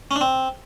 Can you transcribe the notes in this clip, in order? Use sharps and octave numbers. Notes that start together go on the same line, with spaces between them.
C#4
D4
C4